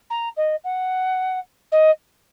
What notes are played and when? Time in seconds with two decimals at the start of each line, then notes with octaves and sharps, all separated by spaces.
0.10 A#5
0.37 D#5
0.64 F#5
1.72 D#5